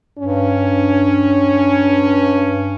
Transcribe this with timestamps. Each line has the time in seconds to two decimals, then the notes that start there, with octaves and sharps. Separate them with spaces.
0.19 G2 C#4